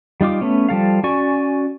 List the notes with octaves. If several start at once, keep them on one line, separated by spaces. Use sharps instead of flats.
G3 D#4 F4 D6
A3 B3 C#4
F3 G3 A4 F5
C#4 F#4 D5 G#5 C#6